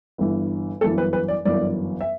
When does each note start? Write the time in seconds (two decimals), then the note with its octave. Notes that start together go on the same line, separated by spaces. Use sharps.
0.18 G1 G2 E3
0.81 G1 F#2 E3 A4
0.98 B4
1.13 B4
1.28 D5
1.45 G1 F#2 E3 D5
2.01 E5